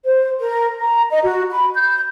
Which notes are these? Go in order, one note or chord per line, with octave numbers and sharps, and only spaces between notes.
C5
A#4
A#5
D#5
F#4
B5
G6